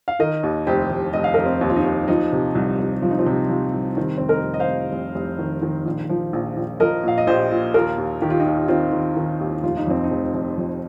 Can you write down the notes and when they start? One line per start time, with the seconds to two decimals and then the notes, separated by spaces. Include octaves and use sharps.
0.08 F5
0.19 D#3 A#4 D#5
0.43 D#2
0.67 F1 G4 C5
0.90 F1
1.13 F1 D#5
1.24 F5
1.34 F1 A#4 D#5
1.46 C4
1.61 D#2
1.70 F4
1.76 D#4
1.85 D#2
2.08 F3 D#4
2.32 C3
2.55 C2
2.80 C2
3.02 F3 F4
3.11 D#4
3.19 C4 F4
3.26 C3
3.49 F3
3.73 C2
3.97 D#3 C4
4.18 F1 C4
4.28 A#4 D#5
4.44 F1
4.54 D#5
4.59 C5 F5
4.68 F1
4.92 F1
5.15 F1
5.38 D#3
5.62 D#3
5.86 A#1
6.09 F3
6.33 A#1
6.57 A#1
6.80 F3 A#4 D#5
7.04 A#2 F5
7.18 D#5
7.27 A#1 G4 C5
7.51 A#2
7.74 D#2 F4 A#4
7.98 D#2
8.22 D#3 G4
8.30 F4
8.40 D#4 G4
8.46 D#2
8.68 D#3 C4 F4
8.92 D#3
9.16 D#3
9.40 D#2
9.63 F1 F4
9.77 D#4
9.87 F2 C4
10.04 D#4
10.11 F1
10.34 F1
10.57 F2